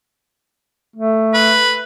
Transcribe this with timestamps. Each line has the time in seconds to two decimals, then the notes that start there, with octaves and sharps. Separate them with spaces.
0.96 A3
1.34 B4